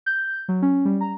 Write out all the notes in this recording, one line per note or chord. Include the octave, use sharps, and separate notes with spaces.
G6
F#3
C#4
G3
A#5